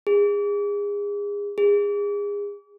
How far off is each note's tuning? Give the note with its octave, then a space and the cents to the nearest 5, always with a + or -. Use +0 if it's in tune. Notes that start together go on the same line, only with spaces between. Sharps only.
G#4 -30
G#4 -30